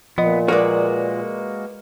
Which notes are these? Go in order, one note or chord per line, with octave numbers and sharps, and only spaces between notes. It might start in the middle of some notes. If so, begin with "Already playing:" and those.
A#2 F3 B3 D#5
G#3 A#3 F#4 A#4 B4 D5